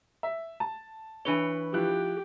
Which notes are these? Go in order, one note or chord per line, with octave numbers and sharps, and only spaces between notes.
E5
A5
E3 D4 B4 C#5 G7
F3 E4 G4 F#6